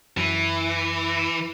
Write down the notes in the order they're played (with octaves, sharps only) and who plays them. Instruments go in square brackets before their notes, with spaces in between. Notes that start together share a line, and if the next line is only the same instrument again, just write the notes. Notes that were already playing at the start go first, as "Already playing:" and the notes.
[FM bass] F#2 [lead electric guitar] E3